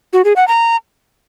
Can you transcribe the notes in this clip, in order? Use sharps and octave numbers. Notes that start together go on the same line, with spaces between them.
F#4
G#4
F#5
A#5